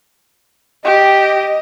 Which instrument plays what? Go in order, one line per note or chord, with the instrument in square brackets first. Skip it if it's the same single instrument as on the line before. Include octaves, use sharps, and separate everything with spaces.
[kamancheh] G4 [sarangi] D#5